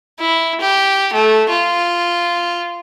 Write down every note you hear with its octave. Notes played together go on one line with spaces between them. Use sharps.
E4
G4
A3
F4